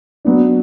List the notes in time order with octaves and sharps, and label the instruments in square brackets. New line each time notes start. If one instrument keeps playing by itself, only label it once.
[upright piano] F#3 B3 D4